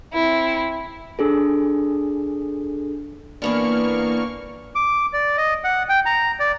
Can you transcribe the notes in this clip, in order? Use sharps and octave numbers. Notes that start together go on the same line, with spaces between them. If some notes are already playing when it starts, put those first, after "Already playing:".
C4 E4
D4 G#4 A4
E3 A#3 B3 D4 C#6 F6
D6
D5
D#5
F#5
G5
A#5
D5